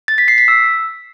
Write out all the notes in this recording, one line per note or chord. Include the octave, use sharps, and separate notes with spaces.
A6
B6
C7
B6
E6